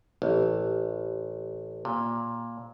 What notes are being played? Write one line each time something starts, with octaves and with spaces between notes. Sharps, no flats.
A1
A#2